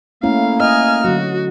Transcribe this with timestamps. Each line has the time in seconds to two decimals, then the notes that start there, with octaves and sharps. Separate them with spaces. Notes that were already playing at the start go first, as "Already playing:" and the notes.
0.23 A3 A#3 C#4 E4 F5
0.60 D#5 G#5 F6
1.05 D3 F#3 F#4